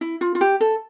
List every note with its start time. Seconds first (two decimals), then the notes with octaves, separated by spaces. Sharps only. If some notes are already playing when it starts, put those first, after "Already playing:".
0.01 E4
0.21 F4
0.35 F4
0.41 G4
0.60 A4